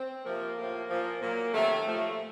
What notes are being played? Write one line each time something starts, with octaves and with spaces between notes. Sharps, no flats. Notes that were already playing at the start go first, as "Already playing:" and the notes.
Already playing: C4
C3 F3 A#3
A2 F3
A#2 F3
A#2 F#3 A#3
C3 D#3 F#3 A3
A#2 F3 A3